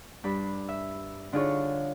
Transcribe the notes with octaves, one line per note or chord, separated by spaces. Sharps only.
G2 D4 B5
E5
D3 D4 D#4 F4 G#4 C#5